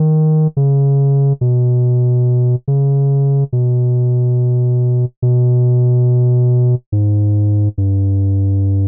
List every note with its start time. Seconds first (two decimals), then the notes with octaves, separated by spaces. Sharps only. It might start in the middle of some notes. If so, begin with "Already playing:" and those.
Already playing: D#3
0.57 C#3
1.41 B2
2.68 C#3
3.53 B2
5.22 B2
6.92 G#2
7.78 G2